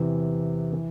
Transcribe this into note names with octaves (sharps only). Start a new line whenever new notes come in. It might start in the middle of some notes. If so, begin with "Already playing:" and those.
Already playing: E2 C3 E3
E3